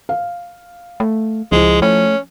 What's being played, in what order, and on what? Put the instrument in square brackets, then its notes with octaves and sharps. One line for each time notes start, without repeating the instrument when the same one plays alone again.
[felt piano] F5
[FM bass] A3
[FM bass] C#2 [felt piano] F3 E4 [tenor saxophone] G#3
[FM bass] A3 [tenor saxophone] C#4